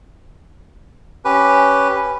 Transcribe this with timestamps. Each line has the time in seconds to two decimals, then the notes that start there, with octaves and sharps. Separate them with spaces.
1.25 C#4 G4 B4